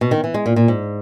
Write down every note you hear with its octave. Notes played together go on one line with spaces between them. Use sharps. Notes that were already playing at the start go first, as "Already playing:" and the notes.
B2
D#3
E3
G#3
A#2
A#2
G#2